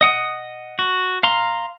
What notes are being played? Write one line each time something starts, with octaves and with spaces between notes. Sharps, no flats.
D#5 F#5 D#6
F#4
F5 A#5 C6